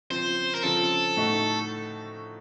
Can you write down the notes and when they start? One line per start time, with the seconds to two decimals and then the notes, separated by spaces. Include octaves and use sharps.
0.11 C#3 F3 C4 C5
0.55 A#4
0.63 C#3 F3 C4 A4
1.16 A2 A3 D#4 F#4